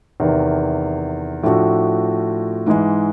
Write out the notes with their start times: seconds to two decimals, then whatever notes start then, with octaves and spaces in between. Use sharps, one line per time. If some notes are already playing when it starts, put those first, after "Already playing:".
0.20 E2 C3 D#3
1.43 A2 F3 A3 D4 F#4
2.66 G#2 E3 G#3